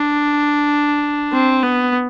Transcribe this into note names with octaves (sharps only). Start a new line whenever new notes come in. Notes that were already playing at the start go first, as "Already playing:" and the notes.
Already playing: D4
C4
B3